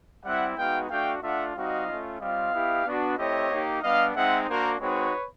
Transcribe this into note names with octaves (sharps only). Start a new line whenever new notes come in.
G3 C4 E4 E5 F#5
G#3 B3 D#4 F#4 F5 G5
A3 D4 F#4 F5 G5
A3 D4 F4 E5 F#5
G3 C4 D#4 F#4 D#5 F5
A3 C#4 F4
G3 C4 F4 D#5 F5
B3 E4 G4
B3 D4 F#4
A3 C4 E4 G4 C#5 D#5
A#3 D#4 G4
G3 B3 D4 D#5 F5
G#3 C4 D#4 E5 F#5
A#3 D4 F#4 A#4 C5
G#3 C4 D#4 F#4 B4 C#5